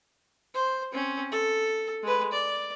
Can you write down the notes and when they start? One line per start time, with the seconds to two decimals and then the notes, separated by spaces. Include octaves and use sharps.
0.54 C5
0.91 C4 C#4
1.32 A4
2.03 G#3 B4
2.32 D5